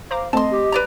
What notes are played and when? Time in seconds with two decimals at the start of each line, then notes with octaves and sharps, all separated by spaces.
0.11 C5 F5 A#5 D6
0.33 A3 C4 D#5 A5 C6
0.51 G4
0.72 B4 D5 A#5